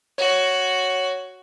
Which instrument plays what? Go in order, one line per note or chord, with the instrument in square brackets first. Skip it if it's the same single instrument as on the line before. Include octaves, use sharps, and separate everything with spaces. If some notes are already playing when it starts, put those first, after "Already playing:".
[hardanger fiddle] F#4 [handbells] C#5